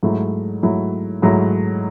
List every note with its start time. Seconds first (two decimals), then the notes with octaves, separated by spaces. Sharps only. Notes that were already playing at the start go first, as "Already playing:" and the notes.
0.03 G#2 F#3 A3 E4
0.63 G#2 F#3 A3 E4
1.22 G#2 F#3 A3 E4